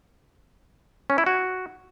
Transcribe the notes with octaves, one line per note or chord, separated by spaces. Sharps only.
C#4
E4
F#4